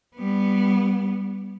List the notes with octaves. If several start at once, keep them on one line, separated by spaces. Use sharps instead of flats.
G3 B3